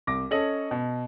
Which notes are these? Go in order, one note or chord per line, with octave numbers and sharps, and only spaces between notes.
C2 D6 A#6
C#4 A4 C#5 D#5 F#7
B2